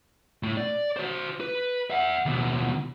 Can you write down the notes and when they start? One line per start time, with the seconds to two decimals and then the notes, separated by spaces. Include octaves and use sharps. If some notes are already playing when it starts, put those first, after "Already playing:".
0.43 A2 A3
0.57 D5
0.97 F#4 C5
1.41 B4
1.90 E5 F#5
2.26 D#2 B2